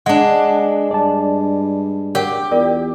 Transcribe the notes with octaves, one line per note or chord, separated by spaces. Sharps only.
G#3 D4 F#5
G2 D5 A5
G4 A#4 C#5 F#5
E2 F4 A#4 D5